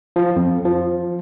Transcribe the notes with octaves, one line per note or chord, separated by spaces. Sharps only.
F3
F2
F3